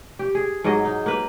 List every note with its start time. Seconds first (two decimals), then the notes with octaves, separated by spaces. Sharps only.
0.19 G4
0.35 G#4
0.64 G#2 F#3 G#4 D#5
0.85 D#4
1.06 A#3 B4